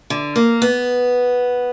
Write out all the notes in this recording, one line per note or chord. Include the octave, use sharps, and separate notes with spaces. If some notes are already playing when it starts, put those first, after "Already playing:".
D3
A#3
B3